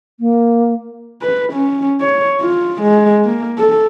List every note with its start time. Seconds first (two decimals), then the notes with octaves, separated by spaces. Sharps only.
0.20 A#3
1.22 B4
1.53 C#4
2.01 C#5
2.41 F4
2.82 G#3
3.25 A#3
3.58 A4